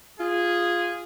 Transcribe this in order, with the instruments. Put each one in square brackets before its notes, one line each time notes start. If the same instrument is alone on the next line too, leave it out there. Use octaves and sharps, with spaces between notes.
[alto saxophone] F4 [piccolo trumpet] G#4